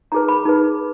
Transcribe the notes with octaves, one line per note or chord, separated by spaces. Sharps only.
D#4 G#4 B4 A#5
B5
D#4 G#4 B4